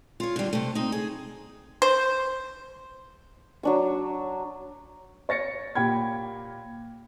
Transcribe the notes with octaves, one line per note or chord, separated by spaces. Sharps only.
F4 C#5
D3 G3
C3 A3
C4 D#4
G#4
C5
F#3 D4 C#6
C#5 A6 A#6 C#7
A#2 G4 G5 B5 G#6